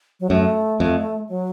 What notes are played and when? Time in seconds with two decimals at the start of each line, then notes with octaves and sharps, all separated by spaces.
0.20 F#3
0.30 F#2 A3
0.80 F2
1.29 F#3